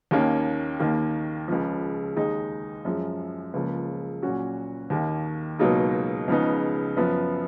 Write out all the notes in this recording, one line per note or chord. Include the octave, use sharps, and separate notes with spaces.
D#2 D#3 A#3 C#4
D#2 D#3 A#3
C#2 C#3 F3
D#2 D#3 G#3 D#4
F#2 F3 G#3
C#2 C#3 F3 A#3
A#2 F#3 C#4 F#4
D#2 D#3 A#3
C#2 B2 F#3 A#3 D#4
C#2 C#3 F3 B3 D#4
F#2 F3 B3